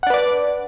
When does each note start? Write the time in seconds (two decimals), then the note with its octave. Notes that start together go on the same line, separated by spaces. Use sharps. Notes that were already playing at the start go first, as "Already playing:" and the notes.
0.03 F#5
0.07 D4
0.10 B4
0.14 D5